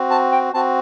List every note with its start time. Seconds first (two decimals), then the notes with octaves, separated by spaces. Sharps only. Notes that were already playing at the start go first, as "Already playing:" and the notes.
Already playing: C4 F#4
0.10 A5
0.32 G5
0.54 C4 F#4 A5